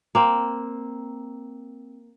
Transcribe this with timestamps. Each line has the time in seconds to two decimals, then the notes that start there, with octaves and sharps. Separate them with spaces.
0.15 A#3 C4